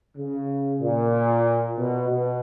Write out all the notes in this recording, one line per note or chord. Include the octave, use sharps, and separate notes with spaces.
C#3
A#2
B2
B2